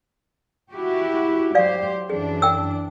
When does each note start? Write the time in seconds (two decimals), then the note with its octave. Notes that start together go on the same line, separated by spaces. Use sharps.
0.72 E4 F#4 G4
1.55 F#3 G4 C5 D5 F5
2.10 F#2 E3 D4 G#4
2.42 G5 E6